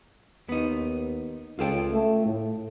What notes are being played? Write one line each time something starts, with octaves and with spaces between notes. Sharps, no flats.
D#2 B3 D#4
C#2 F4 A4 G5
A3
A2